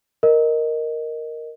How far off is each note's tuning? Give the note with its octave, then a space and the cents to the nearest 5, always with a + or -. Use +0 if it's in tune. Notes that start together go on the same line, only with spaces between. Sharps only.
A#4 +0 D#5 +0